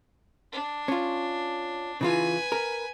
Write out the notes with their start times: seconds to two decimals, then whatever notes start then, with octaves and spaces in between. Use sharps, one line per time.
0.52 D4
0.88 C#4 F4
2.01 C#3 E3 F4 B4 G#5
2.52 A#4